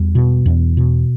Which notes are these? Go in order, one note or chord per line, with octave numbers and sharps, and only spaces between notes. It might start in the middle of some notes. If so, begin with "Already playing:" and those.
Already playing: E2 G3
B2
E2
B2